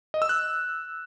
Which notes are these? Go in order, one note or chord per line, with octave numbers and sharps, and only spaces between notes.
D#5
E6
F#6